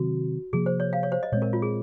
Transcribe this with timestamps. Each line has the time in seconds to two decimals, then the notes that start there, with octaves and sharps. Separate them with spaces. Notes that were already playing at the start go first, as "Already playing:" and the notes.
Already playing: C3 D#3 F#3 C4 F#4
0.53 C3 F3 A#3 G#4
0.66 C5
0.80 C#5
0.93 F5
1.03 C#5
1.12 C5
1.23 D#5
1.32 A#2 G#3 C4 C#5
1.42 A#4
1.53 F4
1.62 G#4